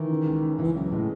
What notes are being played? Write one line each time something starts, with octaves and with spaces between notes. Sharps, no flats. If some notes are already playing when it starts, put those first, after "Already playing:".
Already playing: D#3 E3
C#3
C#2
C#3
C#2 E3
C#2 F#3
B2
A2 G#3